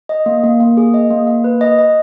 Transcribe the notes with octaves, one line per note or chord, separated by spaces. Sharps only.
D#5
A#3
A#3
A#3
G#4
D#5
A#3
A#3
B4
D#5
D#5